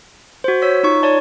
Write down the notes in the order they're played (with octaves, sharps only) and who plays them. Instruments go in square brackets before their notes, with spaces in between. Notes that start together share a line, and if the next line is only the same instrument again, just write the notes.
[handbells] F#4 C5
C#5 E6 B6
D#4 F4 C#6
C#5 D5 A5